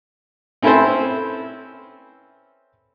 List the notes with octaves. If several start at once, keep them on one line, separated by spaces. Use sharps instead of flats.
C4 C#4 E4 A4 B4 C5